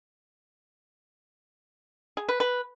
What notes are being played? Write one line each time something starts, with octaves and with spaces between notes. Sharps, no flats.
G#4
B4
B4